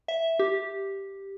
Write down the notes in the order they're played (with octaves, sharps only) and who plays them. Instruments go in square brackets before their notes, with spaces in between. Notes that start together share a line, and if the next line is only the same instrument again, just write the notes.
[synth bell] E5
G4